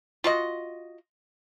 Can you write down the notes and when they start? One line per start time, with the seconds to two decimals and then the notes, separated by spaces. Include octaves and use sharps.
0.24 F4 F#4 D#5